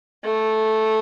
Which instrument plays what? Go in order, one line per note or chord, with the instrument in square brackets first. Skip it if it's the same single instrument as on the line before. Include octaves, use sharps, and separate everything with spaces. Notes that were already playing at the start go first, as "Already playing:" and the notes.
[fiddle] A3